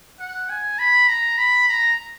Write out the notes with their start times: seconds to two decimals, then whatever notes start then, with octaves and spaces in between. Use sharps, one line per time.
0.19 F#5
0.49 G#5
0.79 B5
1.08 A#5
1.37 B5
1.68 A#5